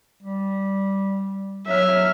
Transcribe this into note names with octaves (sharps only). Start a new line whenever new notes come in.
G3
F#3 E5 F6